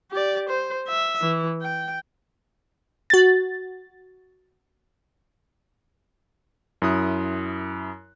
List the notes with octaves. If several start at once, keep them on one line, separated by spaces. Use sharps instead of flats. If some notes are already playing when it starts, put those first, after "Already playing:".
G4 D5
C5
E5
E3
G5
F#4 A6
F#2 E4 D#6 F#6